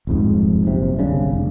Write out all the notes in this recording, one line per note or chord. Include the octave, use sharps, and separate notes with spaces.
D#1 F2 G#2
F#1 C3
G1 C2 C#3 D4
F1